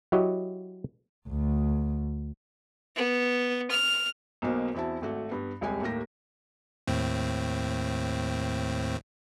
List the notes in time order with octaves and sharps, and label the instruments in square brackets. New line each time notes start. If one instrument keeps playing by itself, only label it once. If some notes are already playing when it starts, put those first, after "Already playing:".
[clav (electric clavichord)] F#3 E4 F#4 G4 C#5 D#5
[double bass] D2
[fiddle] B3
F6
[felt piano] B1 B2 F#3 A#3 C5
E2 C4 E4 F#4 A5
G#1 A3 F#4
G2 B3
D#1 C2 G#3 G4 G#5
D#2 A2 A#3 G4 A#6
[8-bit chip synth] D#2 A2 C4